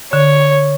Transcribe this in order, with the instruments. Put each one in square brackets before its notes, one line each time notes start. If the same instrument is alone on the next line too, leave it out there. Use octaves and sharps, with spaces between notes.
[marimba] D3 [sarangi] C#5